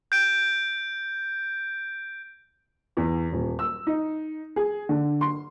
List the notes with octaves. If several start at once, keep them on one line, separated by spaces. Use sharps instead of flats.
G6 D7
E2
D#1
E6
D#4
G#4
D3
C6